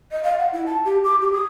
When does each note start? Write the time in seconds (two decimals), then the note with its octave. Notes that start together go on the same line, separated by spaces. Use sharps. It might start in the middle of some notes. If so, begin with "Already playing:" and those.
0.11 D#5
0.23 F5
0.39 F#5
0.53 E4
0.66 A5
0.85 G4
1.04 D6
1.21 G4
1.32 D#6